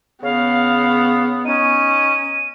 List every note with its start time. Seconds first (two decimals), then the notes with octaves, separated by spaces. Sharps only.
0.23 C#3 B3 F5
1.45 C#4 D#4 D#7